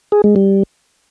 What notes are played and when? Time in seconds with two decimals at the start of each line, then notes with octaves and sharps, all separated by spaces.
0.12 G#4
0.24 G#3
0.36 G3